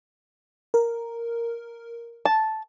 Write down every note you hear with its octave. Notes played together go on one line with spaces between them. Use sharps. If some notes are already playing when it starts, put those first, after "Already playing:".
A#4
A5